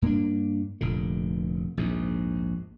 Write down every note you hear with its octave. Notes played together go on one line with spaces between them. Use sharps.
G2 A#3 C4 D4
F1 A#2 D3
A#1 D#2 G#2